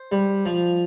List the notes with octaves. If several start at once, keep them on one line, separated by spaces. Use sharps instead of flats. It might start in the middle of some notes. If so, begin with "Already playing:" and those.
Already playing: C5
G3
F3